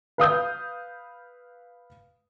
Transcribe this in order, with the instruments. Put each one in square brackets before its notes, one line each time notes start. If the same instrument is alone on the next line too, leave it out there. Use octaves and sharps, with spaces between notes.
[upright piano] B4 F5 D#6 G6